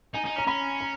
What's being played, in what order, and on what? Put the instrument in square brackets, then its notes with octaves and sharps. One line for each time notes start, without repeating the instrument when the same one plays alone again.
[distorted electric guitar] D#4 [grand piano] G#5
[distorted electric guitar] D#4
[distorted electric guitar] C#4 [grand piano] A#5
[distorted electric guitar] C#4 [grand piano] B5
[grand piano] A#5